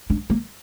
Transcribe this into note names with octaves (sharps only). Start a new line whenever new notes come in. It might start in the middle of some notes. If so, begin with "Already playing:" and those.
D4
A#3